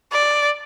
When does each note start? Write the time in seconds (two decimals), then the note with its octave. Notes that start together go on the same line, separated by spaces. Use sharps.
0.12 D5